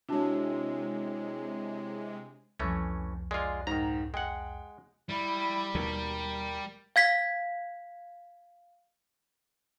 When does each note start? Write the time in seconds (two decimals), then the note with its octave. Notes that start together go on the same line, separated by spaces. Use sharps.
0.09 C3 G#3 D4 E4 F#4 C#5 A5
2.60 C2 F2 E3 A3 C#4
3.31 G#3 F4 D5
3.67 G#2 D#3 A#5
4.14 G#3 F#5 G5
5.10 G3 E4
5.75 D#2 B2 A#4
6.96 F5 G#6 B6